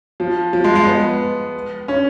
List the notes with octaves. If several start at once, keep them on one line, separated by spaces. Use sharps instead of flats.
F3
F3
G#3
G#3
B3
C#4